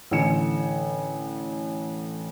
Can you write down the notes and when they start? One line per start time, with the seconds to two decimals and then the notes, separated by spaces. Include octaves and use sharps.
0.11 A1 D3 G5 G#5 C#7 E7